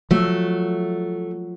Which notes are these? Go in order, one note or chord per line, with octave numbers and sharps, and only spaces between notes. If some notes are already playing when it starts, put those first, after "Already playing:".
F3 F#3 A3